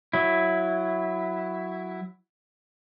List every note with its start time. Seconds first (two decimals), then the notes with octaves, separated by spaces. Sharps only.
0.13 F#3 E4